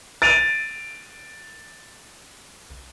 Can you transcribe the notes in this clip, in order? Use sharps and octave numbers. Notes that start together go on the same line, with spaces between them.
A6 D7 D#7 F7